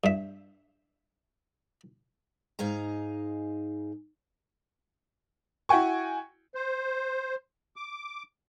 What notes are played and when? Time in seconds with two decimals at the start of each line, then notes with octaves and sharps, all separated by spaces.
0.04 G2 E5
2.59 G#2 D#4 G#4 F5 A#5
5.69 E4 F#4 G5 G#5 C#6
6.55 C5
7.76 D6